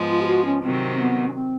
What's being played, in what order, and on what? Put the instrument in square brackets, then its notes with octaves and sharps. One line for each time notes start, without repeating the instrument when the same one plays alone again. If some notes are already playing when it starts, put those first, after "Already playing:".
Already playing: [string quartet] G#2 F3 G#3 B3
[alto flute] F4
G4
F#4
C#4
[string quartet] C3 D#3 F#3 [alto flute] C4
[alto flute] B3
C#4
C4